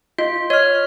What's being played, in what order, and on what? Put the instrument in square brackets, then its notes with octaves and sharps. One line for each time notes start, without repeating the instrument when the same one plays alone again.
[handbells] F4 [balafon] D#5
[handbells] C#5 F6 [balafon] D#5